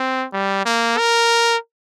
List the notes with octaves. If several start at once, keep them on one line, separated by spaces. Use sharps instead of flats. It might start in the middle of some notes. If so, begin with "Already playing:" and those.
Already playing: C4
G3
A#3
A#4